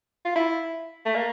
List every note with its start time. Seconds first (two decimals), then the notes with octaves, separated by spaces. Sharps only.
0.25 F4
0.36 E4
1.05 A3
1.15 A#3